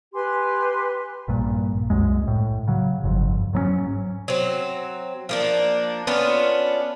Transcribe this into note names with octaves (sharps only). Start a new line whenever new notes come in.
G4 B4 G#5 C6
A#1 G2 A#2
C2 F#2 G#3
A2
C#3 F#3
G1 F2
G#2 F#3 G#3 C#4
F#3 C4
F3 A#3 D4
B3 C#4 D4 F4